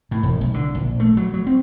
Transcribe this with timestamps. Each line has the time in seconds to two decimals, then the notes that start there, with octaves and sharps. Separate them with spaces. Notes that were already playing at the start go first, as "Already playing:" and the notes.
0.11 A2
0.23 E1
0.41 B1
0.54 D3
0.75 A#1
1.00 A3
1.17 F#3
1.34 F#3
1.47 C4